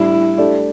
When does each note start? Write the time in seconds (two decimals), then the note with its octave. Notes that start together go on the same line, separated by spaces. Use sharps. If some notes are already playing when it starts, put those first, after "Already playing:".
Already playing: A2 G3 D4 E4
0.38 A3 D4 G4 D5